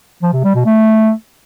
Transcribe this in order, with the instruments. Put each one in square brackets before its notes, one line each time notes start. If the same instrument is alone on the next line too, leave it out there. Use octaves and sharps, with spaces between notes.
[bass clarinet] F3
C3
G3
B2
A3